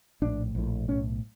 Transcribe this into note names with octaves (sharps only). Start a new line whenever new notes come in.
A#1 A2 D4
A#1 A2
B1 A2 C#4